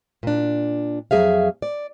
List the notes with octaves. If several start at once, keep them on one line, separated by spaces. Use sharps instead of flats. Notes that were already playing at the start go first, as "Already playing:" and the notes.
A#2 D4
F2 F#3 G#4 E5 F5
D5